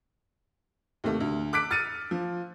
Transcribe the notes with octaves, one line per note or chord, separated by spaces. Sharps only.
D#2 C3 A3
D2
D6 F#6 B6 D7
F6 A6 C#7 D#7
F3